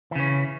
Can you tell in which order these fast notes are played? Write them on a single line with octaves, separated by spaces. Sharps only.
E3 C#3 C#4